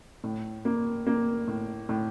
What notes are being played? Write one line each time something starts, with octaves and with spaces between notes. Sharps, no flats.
A2
A#3
A#3
A2
A2